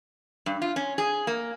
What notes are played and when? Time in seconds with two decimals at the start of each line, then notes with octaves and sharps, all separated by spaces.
0.46 G2
0.62 F4
0.76 C#4
0.98 G#4
1.27 A#3